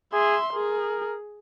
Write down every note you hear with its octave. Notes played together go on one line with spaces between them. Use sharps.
G#4 E5 C6
G#4 A#4